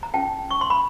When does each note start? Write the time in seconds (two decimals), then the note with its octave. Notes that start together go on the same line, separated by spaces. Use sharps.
0.03 A#5
0.14 C#4 F4 G#4 G5 A5
0.51 C#6
0.61 C6
0.70 B5